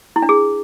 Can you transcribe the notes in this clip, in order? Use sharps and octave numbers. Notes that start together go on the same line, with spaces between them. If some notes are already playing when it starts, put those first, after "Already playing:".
E4
D4
G#4